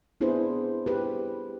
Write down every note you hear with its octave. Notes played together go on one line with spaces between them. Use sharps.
B3 D4 E4 G#4 B4 C5
G4 B4